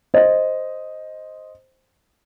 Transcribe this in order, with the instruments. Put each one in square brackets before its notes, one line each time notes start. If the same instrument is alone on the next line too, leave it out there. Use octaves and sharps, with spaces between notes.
[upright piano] C5 D#5